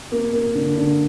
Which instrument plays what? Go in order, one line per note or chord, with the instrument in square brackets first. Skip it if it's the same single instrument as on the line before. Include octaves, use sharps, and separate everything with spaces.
[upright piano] A#3
A#3
D3
D3